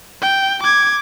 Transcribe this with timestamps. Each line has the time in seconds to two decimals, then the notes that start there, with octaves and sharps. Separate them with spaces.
0.22 G5
0.63 D6 G#6